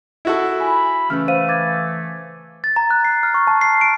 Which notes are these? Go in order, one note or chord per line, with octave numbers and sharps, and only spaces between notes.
E4 F#4 A4
G#5 B5
C#3 E3 A3 F6
C5 F5 D#7
D6 G#6 A6
A6
A#5
F#6
C7
F6
C#6
A5
C7
D7